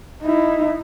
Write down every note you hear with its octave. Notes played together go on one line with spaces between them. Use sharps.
D#4 E4